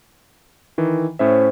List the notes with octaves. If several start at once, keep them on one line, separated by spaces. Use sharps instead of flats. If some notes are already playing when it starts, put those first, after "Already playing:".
D#3 E3
A2 C#4 C5 E5